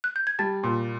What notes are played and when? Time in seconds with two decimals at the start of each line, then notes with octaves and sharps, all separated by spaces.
0.04 F#6
0.16 G6
0.27 G#6
0.39 G3 A5 A6
0.63 A#2